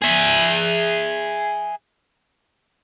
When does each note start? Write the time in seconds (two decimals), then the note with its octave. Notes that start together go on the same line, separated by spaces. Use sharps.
0.02 G#4 E5